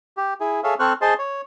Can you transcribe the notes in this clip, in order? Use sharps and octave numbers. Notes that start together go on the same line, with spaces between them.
G4
E4 G#4
G#4 A4 C#5 E5 F5
C4 A4 C5 C#6 F6 F#6
G#4 C5 D#5 A5 C6
C#5